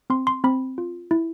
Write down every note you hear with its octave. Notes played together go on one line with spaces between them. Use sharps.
C4 C6
C6
C4 B5
F4
E4